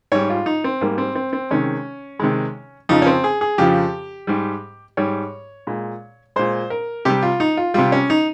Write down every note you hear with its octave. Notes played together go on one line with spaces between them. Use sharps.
G#2 G3 C#5
F4
D#4
C4
G#2 G3 A#3
C4
C4
C4
C3 D#3 G#3 C#4
C3 D#3 G#3
F2 C#3 F3 D#4
C#4
C4
G#4
G#4
F2 C#3 F3 G4
G#2 G3
G#2 G3 C#5
A#2 G#3
A#2 G#3 C5
A#4
C3 G3 G4
F4
D#4
F4
C3 G3 F4
C#4
D#4